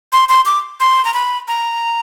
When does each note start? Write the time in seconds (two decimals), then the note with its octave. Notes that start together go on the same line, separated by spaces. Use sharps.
0.13 C6
0.29 C6
0.46 D6
0.80 C6
1.05 A#5
1.14 B5
1.48 A#5